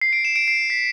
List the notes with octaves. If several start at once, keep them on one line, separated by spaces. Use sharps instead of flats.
C7
D7
E7
D7
C7
B6